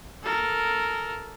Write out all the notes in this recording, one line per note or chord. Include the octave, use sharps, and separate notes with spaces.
A4 A#4